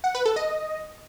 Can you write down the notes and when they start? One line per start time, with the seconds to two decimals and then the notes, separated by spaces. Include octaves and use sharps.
0.04 F#5
0.15 B4
0.25 A4
0.36 D#5